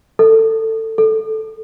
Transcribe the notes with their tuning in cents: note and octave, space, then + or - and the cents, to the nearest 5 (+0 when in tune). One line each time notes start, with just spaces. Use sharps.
A4 +20
A4 -5